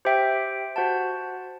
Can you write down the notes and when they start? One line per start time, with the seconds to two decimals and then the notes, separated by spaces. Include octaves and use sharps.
0.05 G4 C5 E5 G5
0.76 F#4 C5 F#5 A5